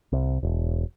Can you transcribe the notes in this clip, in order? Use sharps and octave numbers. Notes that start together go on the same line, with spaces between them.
C2
E1